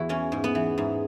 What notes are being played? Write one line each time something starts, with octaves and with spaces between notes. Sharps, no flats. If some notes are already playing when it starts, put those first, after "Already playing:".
Already playing: E2 E4 F#4
E3 C#4
G#2
B3
E3
G#2